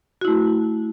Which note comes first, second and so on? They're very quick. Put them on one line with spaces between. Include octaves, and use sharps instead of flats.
F#4 E4 A3